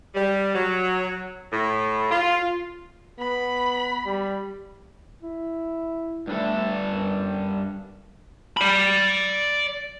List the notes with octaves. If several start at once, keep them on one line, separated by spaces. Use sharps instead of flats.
G3
F#3
A2
F4
B3 B5
G3
E4
G2 A3 D4 A4
F#2
D5 B5